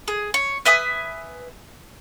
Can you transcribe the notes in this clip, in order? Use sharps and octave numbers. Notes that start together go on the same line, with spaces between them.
G#4
C#5
B4 E5 G#5 D#6